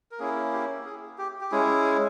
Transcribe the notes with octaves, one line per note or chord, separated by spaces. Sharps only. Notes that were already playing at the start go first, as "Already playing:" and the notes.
A#4
A#3 C#4 E4 G#4
G4
G#4
G4
G4
G#3 C#4 E4 G#4